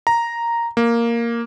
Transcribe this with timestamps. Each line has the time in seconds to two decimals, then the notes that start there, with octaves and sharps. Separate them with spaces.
0.07 A#5
0.77 A#3